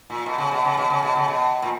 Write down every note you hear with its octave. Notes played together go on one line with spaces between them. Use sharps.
A#2
B2
C#3
B2
C#3
B2
C#3
B2
C#3
B2
A#2